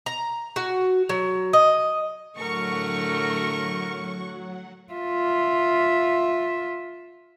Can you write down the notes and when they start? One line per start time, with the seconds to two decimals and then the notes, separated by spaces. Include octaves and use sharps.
0.06 A#5
0.56 F#4
1.09 F#3
1.53 D#5
2.39 A2 D3 F#3 A3 A#4 F#5 C#6
4.93 F4 E5